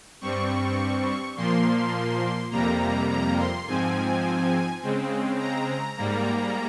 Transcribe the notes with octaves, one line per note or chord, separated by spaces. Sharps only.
G2 G3 C4 C#6
A#2 F3 A#3 C6
F2 C3 G3 A#3 A#5
A#5
C6
G#2 F3 C4 G#5
C#3 G#3 C4
A#5
G#2 G3 A#3